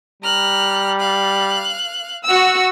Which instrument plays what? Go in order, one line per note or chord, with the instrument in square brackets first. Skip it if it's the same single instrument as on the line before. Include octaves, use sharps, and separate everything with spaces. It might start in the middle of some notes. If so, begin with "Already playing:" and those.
[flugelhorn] G3 [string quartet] A#5 F6 F#6
[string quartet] F5 F#6
[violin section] F#4 E6